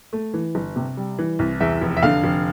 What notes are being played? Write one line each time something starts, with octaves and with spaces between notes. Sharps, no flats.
A3
E3
G1
C3
G3
E3
C2
E2 E5
F1
E5
D3 F5
F1